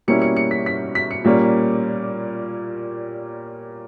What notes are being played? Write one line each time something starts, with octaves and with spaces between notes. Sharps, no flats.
B2 G3 A#3 C#4 E4 C#7
C#7
C#7
B6
B6
B6
C#7
A#2 G3 A#3 C#4